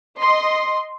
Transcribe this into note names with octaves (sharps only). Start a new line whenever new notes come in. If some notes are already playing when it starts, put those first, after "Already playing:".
D#5 C6